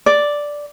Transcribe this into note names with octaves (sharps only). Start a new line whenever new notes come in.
D5